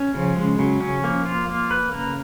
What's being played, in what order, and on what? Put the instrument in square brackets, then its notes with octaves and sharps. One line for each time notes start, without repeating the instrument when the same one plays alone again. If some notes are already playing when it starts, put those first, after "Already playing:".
Already playing: [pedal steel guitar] C#4
[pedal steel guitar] C#3 [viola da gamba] F3
[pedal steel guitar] G#3
[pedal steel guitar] C#3 [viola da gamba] F#3
[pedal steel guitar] C#4
[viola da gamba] F3 [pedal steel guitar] A#3
[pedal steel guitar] F4
A#3
B4
[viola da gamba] C#3 [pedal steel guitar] A#3